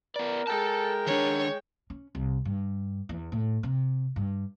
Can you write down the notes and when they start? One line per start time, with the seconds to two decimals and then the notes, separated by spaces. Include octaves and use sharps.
0.16 B3 A#4 D5
0.47 G#3 A4 G5 A5
1.07 D#3 D4 C#5
1.90 C#4
2.15 C2
2.45 G2
3.09 E2
3.32 A2
3.63 C3
4.16 G2